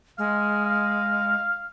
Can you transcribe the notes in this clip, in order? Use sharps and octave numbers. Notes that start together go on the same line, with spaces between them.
G#3 F5
F5